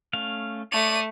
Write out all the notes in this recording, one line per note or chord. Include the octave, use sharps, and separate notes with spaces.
A3 C#4 F5
A3 C#5 D5 D#7